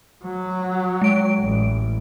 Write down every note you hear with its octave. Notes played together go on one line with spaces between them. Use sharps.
F#3
G#3 D7
A1